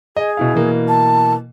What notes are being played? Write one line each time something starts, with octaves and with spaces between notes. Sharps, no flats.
G#4 D#5
B2 E4 F5
B2 E3 A#3
A5